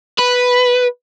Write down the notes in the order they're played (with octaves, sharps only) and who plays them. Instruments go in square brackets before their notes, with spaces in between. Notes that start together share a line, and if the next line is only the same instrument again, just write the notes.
[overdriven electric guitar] B4